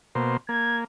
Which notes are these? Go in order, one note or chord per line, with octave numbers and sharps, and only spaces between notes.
B2 A#3 C5
A#3 G#6